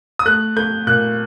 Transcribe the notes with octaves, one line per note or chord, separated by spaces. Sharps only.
D#6
A3 F#6
A3 G6
A#2 F#6